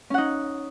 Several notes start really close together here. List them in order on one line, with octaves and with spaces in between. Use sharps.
C#4 F#5 D#4